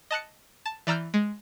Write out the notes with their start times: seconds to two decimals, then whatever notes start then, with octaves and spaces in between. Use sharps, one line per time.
0.11 D#5 A5 F#6 C#7
0.66 A5
0.87 E3 D5 A#5 E6 F6 G6
1.14 G#3